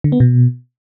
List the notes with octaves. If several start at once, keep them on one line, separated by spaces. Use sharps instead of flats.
D3
B3
B2